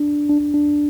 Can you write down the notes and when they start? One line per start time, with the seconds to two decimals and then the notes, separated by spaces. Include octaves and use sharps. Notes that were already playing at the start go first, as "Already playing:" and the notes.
Already playing: D4
0.29 D4
0.54 D4